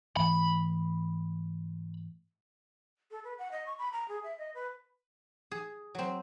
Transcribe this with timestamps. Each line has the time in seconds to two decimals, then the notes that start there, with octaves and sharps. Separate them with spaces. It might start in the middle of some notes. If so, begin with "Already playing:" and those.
0.17 G#2 E3 A3 B5
3.11 A4
3.24 B4
3.38 F#5
3.51 D#5
3.66 C#6
3.79 B5
3.93 A#5
4.08 G#4
4.23 E5
4.39 D#5
4.54 B4
5.51 G#4
5.95 F#3 C4